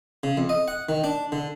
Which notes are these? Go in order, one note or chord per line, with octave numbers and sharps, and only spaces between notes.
C#3
F2
D#5
F#5
D#3
D4
D3